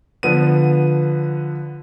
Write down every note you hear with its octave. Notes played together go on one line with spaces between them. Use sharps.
D3 F3 B3 D#7